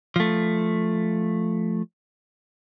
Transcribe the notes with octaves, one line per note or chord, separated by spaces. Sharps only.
F3 A3